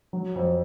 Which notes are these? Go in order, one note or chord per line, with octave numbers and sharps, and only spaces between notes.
F#3
F2